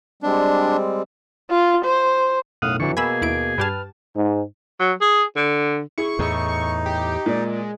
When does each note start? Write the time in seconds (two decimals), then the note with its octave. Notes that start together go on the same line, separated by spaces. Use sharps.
0.23 G3 G#3 C4 D4
1.50 F4
1.85 C5
2.62 B1 F#2 A2 F5 F#5 D#6
2.80 F2 D3 E3 F#3 C#6
2.97 B2 A#3 G#4 G#5 B5 E6
3.22 D#2 E4 D7
3.58 G2 G4 B4 A5 F6
4.16 G#2
4.80 F#3
5.01 G#4
5.36 D3
5.98 E4 G#4 C#6
6.19 E2 A2 D#4
6.86 G4
7.26 A#2 G#3 D5